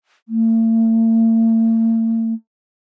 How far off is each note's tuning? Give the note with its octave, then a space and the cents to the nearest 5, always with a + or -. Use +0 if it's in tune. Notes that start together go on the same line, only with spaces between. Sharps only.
A3 +45